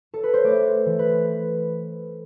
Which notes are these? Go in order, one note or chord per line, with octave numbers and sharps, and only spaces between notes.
A4
B4
C5
A3 D5
E3
B4